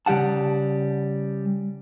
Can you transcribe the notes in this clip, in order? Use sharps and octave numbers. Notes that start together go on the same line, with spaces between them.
C#3 G3 G4 F#5 A5